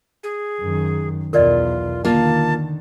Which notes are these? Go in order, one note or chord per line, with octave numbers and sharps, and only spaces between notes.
G#4
F#2 D#3
B1 E2 F4 A#4 D5 D#5
D3 D#3 A#3 F4 A5